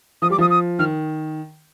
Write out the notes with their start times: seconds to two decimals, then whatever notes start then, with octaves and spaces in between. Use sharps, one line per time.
0.22 F3 D#6
0.30 G3 D6
0.38 F3 D#6
0.50 D#6
0.79 D#3 F6